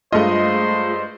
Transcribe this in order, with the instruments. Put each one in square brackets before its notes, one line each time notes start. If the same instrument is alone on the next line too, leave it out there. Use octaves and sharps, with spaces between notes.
[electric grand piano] G2 D#5 [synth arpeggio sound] G#3 A3 F4 [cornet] C5